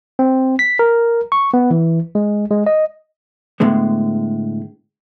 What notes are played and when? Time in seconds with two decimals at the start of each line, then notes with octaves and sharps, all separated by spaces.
0.19 C4
0.59 B6
0.79 A#4
1.32 C#6
1.54 B3
1.71 E3
2.15 G#3
2.51 G#3
2.67 D#5
3.60 A2 D3 G#3 B3